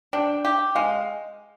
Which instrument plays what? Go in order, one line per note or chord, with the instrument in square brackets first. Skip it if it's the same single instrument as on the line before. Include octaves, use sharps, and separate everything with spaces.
[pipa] D4 [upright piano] G5
[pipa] G4
[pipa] G#3 [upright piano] F5